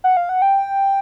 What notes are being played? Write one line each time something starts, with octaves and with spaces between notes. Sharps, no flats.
F#5
F5
F#5
G5